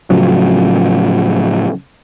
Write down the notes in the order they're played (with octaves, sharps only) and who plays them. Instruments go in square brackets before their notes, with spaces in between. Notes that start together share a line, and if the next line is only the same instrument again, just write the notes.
[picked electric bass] A2 C#3 F3 F#3